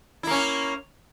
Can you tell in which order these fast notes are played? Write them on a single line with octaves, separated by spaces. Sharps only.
E4 A#3 C#4